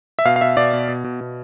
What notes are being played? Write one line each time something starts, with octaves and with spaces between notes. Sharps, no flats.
E5
B2 F5
F5
B2 E5
B2 D5
B2
B2
B2
B2